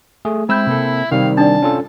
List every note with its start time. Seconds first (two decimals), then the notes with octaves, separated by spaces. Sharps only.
0.25 A3 G#4
0.49 G#3 C4 E4 E5 B5 E6 G6
0.67 C3 A#3 A4
1.11 C3 D#3 G3 C4 D#4 F5
1.37 D4 D5 A5
1.62 C#4 F4 A4